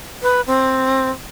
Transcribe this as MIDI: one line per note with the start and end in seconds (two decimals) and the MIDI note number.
0.22 0.41 71
0.47 1.10 60